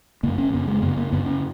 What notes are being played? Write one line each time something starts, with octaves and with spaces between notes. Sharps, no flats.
F#2 C#3 A#3
C#4
F#2 C#3 B3
G#3
F#2 C#3 B3
A#3
F#2 C#3 B3
C#4